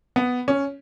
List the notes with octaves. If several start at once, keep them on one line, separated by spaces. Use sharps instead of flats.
B3
C#4